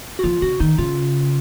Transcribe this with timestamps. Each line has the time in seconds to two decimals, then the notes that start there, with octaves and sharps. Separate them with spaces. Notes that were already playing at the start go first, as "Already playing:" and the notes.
0.19 F#4
0.23 F3 F4
0.42 C#3 F#4
0.60 D#3 D#4
0.78 C#3 F4